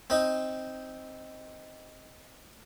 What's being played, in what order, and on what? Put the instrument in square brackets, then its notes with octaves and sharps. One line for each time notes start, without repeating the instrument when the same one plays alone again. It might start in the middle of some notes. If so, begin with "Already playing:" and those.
[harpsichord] C4 D#4